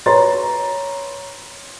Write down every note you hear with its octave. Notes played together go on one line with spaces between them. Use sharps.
B4 C#5 A#5 C6 A6